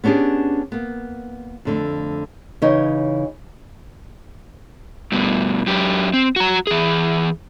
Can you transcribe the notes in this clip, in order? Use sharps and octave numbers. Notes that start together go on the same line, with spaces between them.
B3 C#4 D4 G4 G#4
A#3 B3
F2 D3 A3
C#3 E3 D#4 C#5
G2 B2
F#2 G4
C4
F#4 A#5
E3 G#4